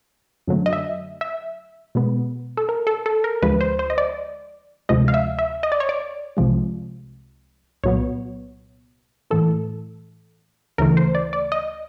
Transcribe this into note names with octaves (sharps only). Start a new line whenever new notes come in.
F#2 D3 F#3 A3
D#5
E5
E5
B2 G#3 B3
A4
A#4
A4
A4
A#4
D2 D3 F3 G#3 B4
C5
C5
D#5
D5
D2 C3 F3 G#3 D#5
F5
E5
E5
D#5
D5
C#5
D5
C2 C3 F3 G#3
C2 A#2 F#3 B3 C#5
A2 E3 A3 A4
D2 C#3 E3 A3 A#4
C5
D5
D5
D#5